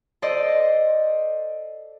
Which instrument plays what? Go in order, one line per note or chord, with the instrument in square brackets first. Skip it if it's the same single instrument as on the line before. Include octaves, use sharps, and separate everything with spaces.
[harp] A4 C5 D5 D#5